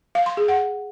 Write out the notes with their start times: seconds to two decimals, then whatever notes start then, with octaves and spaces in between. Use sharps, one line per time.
0.15 F5
0.26 C6
0.37 G#4
0.48 F#5